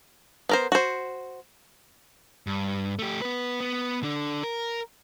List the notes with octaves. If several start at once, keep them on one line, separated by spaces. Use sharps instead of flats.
B3 A#4 C5
F#4 C5
G2
A3 G4
B3 B4
B3
D3 D4
A#4